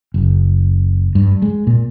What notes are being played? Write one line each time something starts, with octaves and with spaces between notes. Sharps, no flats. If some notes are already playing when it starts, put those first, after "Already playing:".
F#1
G2
G#3
A#2